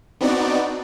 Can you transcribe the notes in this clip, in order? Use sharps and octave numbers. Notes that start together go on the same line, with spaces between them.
B3 C4 D4 D#4 F#4 D5